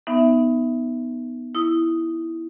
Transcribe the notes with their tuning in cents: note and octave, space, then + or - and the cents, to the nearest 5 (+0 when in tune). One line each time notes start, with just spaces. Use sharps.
B3 +0 D#4 +0 E5 +0
E4 +0 D#6 +0